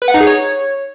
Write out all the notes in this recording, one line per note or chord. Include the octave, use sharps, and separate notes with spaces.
B4
F#5
D#4
G#4
C#5